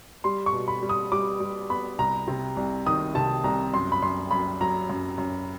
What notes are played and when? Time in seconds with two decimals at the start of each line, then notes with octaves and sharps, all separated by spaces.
0.24 G3 C6
0.46 C#6
0.53 B2
0.68 B5
0.83 G3
0.89 D#6
1.12 G3 D6
1.40 G3
1.69 B3 B5
1.99 C2 A#5
2.28 C3
2.57 C2
2.86 D#3 D#6
3.15 C3 A5
3.44 C2 A#5
3.74 F#2 C6
3.92 B5
4.02 F#2 C6
4.31 F#2 B5
4.61 F#3 A#5
4.90 F#2
5.18 F#2